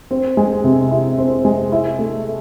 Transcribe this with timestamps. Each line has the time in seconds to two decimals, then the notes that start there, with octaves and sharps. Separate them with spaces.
0.11 C4
0.37 G#3
0.64 C3
0.91 E4
1.18 C4
1.45 G#3
1.72 E4
1.99 A3